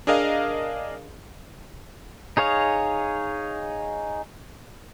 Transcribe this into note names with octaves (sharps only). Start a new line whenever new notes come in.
D4 G#4 A#4 D#5 F5
D#4 G#4 C#5 F5